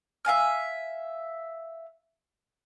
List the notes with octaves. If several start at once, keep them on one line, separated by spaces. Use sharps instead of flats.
E5 F5 G#5 F6